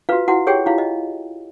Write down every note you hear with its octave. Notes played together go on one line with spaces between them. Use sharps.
F4 F#4 B4 F5
E4 F#4 F#5
G4 G#4 C#5 G5
E4 F4 F5
D#5